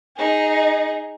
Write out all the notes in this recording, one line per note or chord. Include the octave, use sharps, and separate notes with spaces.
D#4 G#4